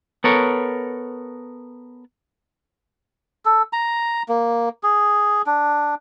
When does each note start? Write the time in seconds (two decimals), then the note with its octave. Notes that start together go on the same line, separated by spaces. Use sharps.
0.24 B3 A4 A#4 C#5
3.45 A4
3.73 A#5
4.29 A#3
4.83 G#4
5.46 D4